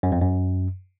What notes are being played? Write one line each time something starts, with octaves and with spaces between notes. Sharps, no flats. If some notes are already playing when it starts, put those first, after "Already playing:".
F#2
F2
F#2